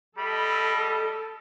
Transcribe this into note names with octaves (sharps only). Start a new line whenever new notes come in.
G3 A4 D#5 B5